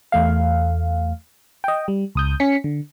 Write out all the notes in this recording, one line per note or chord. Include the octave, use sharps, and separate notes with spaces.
E2 A3 F5
D#5 G5
G3
C#2 D#6 G6
C#4 B6 C#7
D3